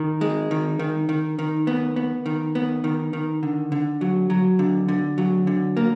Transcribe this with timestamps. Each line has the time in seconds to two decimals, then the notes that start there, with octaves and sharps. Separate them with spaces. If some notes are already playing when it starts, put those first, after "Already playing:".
Already playing: D#3
0.21 G#3
0.51 D#3
0.79 D#3
1.09 D#3
1.39 D#3
1.67 B3
1.96 B3
2.26 D#3
2.55 B3
2.84 D#3
3.13 D#3
3.43 D3
3.72 D3
4.01 F#3
4.30 F#3
4.59 D3
4.88 D3
5.18 F#3
5.47 D3
5.77 A#3